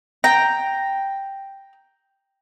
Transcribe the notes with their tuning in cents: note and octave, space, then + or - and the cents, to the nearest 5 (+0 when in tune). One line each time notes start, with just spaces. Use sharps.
G5 +0 A#5 +0